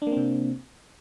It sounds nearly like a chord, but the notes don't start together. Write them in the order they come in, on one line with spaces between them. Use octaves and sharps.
D4 A#3 C4 C3